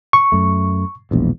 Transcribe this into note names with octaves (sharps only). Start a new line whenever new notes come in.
C#6
F#2 A3
E1 A#1 E2